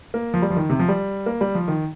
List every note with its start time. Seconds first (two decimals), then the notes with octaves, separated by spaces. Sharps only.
0.14 A#3
0.34 F3
0.42 G3
0.50 F3
0.56 D#3
0.70 C3
0.79 F3
0.89 G3
1.26 A#3
1.41 G3
1.55 F3
1.68 D#3